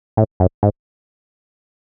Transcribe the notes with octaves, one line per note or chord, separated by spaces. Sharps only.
A2
F#2
G#2